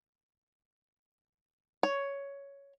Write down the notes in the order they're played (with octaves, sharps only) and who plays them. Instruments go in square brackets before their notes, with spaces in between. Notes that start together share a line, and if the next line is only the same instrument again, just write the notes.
[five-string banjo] C#5